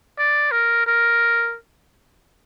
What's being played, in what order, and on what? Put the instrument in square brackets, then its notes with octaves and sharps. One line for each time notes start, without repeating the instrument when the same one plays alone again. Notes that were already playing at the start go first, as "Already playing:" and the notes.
[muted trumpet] D5
A#4
A#4